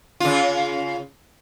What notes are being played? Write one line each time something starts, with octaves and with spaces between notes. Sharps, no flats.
C#3 F4